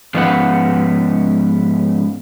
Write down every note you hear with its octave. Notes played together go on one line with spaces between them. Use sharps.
G#2 F3 B3 C#4 B4 F#5